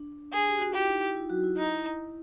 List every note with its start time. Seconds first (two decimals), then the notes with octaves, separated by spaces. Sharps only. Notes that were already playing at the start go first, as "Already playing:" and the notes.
Already playing: D4
0.33 G#4
0.48 G4
0.58 F#4
0.68 F4
0.74 E4 G4
0.88 D#4
1.02 E4
1.16 F4
1.30 F#3 F#4
1.43 E4
1.57 D#4